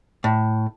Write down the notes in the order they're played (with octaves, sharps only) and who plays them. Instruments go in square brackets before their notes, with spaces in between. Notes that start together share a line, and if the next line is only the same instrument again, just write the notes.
[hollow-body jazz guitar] A2